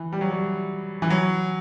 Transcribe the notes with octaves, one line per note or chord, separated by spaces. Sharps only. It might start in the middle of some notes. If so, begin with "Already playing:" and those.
Already playing: E3
G3
F#3
G3
E3
F#3